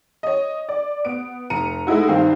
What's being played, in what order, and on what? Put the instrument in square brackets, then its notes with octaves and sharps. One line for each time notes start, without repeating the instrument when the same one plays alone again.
[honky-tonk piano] C#5 D#5
D5
B3 D7
F1 A#5 C#7 D#7
G#3 A3 D#4 E4 F#4
G2 D#3 C4 F5